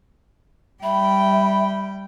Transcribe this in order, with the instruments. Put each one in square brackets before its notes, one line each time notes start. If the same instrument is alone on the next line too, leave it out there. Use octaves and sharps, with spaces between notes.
[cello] G3 G5 [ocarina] E5 [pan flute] B5